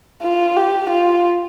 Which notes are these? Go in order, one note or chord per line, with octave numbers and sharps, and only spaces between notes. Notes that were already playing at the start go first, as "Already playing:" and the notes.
F4
G4
F4